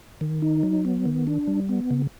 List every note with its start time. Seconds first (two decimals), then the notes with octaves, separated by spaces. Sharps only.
0.21 D#3
0.42 D#4
0.63 F#3
0.85 B3
1.05 D#3
1.27 D4
1.47 G3
1.69 B3
1.90 C#3